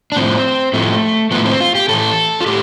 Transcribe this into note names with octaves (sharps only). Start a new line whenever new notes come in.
D4
A2 F3 C4
A2 F3 A3
A2 F3 B3
C4
F4
G4
A2 E3 A4
F4
A2 G4